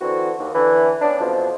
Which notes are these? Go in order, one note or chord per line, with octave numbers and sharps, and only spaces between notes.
D3 E3 C4 F#4
D#2
D3 E3
B3 C#4 D4
F2 B2 E3 F3